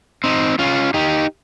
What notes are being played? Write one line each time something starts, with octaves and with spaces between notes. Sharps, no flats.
C4 D#4
C#4 F4
D#4 G4